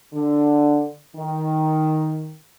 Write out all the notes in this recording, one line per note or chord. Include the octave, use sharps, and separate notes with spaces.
D3
D#3